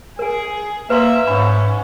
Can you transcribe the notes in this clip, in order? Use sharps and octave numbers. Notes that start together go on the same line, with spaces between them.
G#4 A#4 G#5
A#3 B4 E5 C6
G#2 C#4 B5